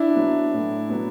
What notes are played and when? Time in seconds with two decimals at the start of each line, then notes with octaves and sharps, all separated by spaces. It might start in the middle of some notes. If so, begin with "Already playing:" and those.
Already playing: D4 E4
0.15 F#3 B3
0.53 A2
0.90 F#3 B3